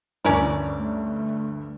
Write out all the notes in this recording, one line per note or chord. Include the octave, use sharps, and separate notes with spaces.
D2 G2 C#4 A#4 D5
A3